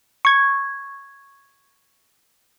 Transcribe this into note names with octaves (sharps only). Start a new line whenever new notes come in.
C#6 G#6